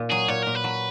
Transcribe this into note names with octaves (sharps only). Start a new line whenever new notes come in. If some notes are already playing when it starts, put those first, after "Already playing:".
Already playing: A#2
F#3 G#4
A#2 C#5
A#2 A#4
B4
F#3